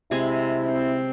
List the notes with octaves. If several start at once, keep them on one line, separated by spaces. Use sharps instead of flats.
C3 G#3 E4 G#5
C4